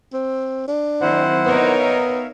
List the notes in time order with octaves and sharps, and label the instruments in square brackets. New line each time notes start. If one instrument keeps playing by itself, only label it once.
[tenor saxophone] C4
D4
[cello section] D#3 F#3 C4 [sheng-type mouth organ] E4 C5 F#5
[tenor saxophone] B3 [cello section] D#4 A#4 C#5
[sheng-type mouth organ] E5 F5